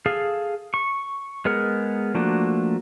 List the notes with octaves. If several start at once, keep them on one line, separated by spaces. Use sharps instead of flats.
G#4 A4 F5
C#6
G#3 B3 G#4 A#4 F#5
F3 A3 A#3 D4 F#4